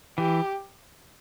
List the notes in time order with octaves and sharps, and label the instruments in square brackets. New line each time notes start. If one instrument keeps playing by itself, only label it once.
[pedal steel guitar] E3 [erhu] G4